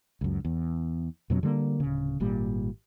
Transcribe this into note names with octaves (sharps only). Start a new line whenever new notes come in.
C#2 F#2
E2
F2 B2 F#3 C#4
D3 G3 G#3 A#3
D1 C#3
G#1 A#2 G3